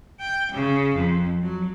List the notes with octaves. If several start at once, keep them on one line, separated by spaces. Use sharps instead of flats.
G5
C#3
F2
F#3